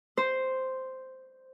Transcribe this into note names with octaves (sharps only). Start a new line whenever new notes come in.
C5